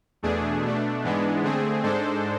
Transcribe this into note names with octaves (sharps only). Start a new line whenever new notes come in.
E2 B2 A3 D4 G#4
B2 A3 D4
G#2 E3 G#3 B3 D4
D3 A3 C4 G#4
G#2 G#3 D4 A4 C5